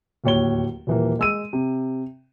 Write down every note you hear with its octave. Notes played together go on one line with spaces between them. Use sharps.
D1 D#2 C#5 G7
D#1 E3 A#3
G#3 E6 D#7
C3